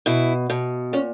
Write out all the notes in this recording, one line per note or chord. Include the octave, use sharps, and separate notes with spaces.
B2 E4
B2
A#2 C#4